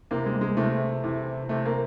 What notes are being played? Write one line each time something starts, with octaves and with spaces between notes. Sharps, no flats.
C3 E3 A#3
G#3
G#3
C3 E3 A3
C3 E3
C3 E3 A3
A#3